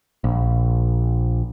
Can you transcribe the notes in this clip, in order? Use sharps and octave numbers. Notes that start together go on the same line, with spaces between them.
A#1